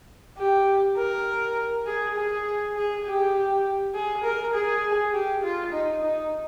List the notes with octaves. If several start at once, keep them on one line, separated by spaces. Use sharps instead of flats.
G4
A#4
G#4
G#4
G#4
G4
G#4
A#4
G#4
G4
F4
D#4
D#4